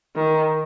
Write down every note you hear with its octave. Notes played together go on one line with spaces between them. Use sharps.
D#3